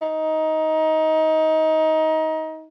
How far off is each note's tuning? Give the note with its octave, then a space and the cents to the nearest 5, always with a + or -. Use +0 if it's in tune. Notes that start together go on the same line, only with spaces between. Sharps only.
D#4 +20